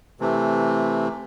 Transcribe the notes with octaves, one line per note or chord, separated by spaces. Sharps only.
C3 E3 A3